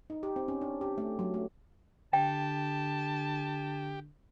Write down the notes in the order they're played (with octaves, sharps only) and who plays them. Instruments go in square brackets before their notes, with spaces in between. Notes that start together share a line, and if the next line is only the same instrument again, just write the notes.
[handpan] D#4
G4
C4
C#4
D4
G4
A3
F#3
A3
[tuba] D3 [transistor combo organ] G4 [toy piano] G5 [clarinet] A5